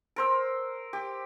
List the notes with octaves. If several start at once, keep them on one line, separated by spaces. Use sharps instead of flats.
A#4 C5 E6
G4